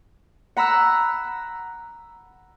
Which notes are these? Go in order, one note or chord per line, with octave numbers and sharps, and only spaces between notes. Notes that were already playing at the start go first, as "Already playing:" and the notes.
F#5 A#5 B5 E6 F#6